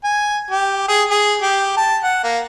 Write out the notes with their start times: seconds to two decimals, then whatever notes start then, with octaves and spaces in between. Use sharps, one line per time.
0.04 G#5
0.51 G4
0.88 G#4
1.10 G#4
1.42 G4
1.77 A5
2.03 F#5
2.24 A#3